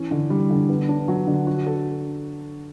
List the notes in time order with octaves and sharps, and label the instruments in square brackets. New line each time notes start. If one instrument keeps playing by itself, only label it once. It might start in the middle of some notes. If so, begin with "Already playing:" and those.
Already playing: [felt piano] E3 C#4
D3
G3
D3
B3
D4
F#3
D3
F#4
A4